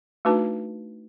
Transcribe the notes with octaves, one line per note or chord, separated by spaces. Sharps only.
A3 D4 D#4 F#4 B4 A5